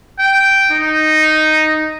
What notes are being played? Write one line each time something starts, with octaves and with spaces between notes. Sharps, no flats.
G5
D#4